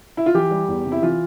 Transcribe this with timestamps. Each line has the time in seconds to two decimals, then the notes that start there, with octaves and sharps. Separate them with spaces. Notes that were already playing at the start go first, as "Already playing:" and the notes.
0.17 E4
0.26 F4
0.35 E3 G4
0.51 G3
0.68 E2
0.86 C3
0.92 E4
1.02 E3 F4